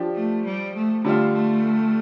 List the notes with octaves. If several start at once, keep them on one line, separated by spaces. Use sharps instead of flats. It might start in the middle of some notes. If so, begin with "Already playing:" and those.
Already playing: F3 D4 G4
A3
G3
A3
D3 G3 A3 F4
A3